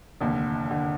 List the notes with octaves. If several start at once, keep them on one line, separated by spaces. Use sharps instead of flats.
F1 D#2 D3
D3